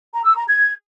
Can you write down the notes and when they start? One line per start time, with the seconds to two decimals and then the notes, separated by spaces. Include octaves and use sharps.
0.13 A#5
0.25 E6
0.36 A#5
0.48 G#6